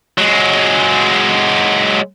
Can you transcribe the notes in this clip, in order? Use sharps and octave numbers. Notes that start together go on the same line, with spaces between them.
F#3 G#3